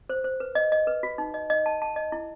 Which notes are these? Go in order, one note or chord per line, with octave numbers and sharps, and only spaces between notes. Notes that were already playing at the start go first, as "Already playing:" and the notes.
C5
C5
B4
D#5
D#5
B4
F#4
D#4
D#5
D#5
A5
A5
D#5
E4